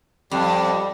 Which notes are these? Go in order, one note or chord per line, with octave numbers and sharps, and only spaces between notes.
F2 G3